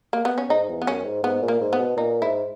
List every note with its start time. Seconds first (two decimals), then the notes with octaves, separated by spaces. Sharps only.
0.13 A#3
0.25 B3
0.38 C#4
0.50 G#2 D#4
0.69 E2
0.82 B3
0.87 F#2 C#4
1.05 G#2
1.23 G#2 B3
1.42 A#2
1.48 A#3
1.61 G#2
1.73 B3
1.79 B2
1.97 A#2 D#4
2.22 G#2 E4